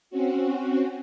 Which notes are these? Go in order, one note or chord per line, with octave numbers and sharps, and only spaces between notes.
C4 C#4 F#4